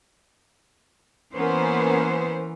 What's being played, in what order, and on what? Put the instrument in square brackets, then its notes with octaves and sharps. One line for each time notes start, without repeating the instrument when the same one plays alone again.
[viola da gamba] E3 [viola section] A#3 C#4 A#4 [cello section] B3 C5